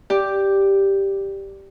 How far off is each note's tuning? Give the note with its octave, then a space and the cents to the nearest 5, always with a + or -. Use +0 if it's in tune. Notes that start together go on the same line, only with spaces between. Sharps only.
G4 +0 D5 +0